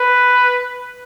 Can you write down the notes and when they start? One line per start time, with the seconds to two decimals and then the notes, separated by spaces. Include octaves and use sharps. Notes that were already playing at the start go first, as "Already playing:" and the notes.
Already playing: B4